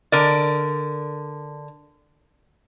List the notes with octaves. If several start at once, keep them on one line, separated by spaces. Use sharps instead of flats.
D3 A#4 D5